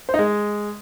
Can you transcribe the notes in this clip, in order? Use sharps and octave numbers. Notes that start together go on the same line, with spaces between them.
C5
D#4
G#3